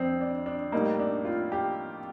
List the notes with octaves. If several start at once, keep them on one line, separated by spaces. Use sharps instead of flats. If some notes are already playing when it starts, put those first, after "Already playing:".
Already playing: F2 C4 D4
D4
D4
A2 G3 A#3 D#4
D4
F4
G4